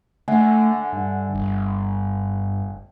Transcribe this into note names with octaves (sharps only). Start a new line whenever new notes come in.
D3 A3 E5 F#5 G#5
G2
G1